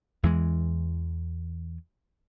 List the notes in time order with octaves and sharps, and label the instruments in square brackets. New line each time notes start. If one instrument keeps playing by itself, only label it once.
[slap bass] E2 E3 G#3